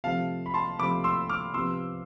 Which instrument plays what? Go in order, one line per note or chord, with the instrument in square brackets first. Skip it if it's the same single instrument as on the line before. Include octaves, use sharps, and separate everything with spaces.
[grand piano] C3 F3 A3 F5 A5
B5
A5 C6
C3 F3 A3 B5 D6
C6 E6
D6 F6
C3 F3 B3 C6 E6